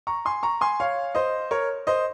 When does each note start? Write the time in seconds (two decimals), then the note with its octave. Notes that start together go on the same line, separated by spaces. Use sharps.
0.07 A#5 C#6
0.25 G#5 C6
0.43 A#5 C#6
0.61 G#5 C6
0.80 C#5 F5
1.15 C5 D#5
1.51 A#4 C#5
1.87 C5 D#5